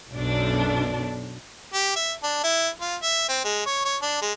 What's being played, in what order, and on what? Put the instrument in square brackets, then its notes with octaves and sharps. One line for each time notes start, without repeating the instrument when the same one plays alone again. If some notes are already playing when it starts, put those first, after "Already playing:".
[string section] B1 F#2 D4
[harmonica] G4
E5
D4
E4
F4
E5
C4
G#3
C#5
C#5
D4
G#3